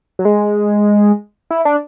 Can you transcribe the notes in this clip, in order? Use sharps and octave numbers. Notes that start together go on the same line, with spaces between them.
F#3
G#3
E4
D4